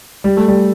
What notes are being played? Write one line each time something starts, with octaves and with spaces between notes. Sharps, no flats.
G3
A3
G3